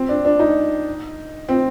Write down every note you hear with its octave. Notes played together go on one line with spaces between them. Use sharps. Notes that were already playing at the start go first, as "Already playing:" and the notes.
Already playing: C4
D4
D4
D#4
C4